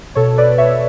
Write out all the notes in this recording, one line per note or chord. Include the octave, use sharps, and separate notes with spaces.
B2 A4 C#5
B4 D5
B2 C#5 E5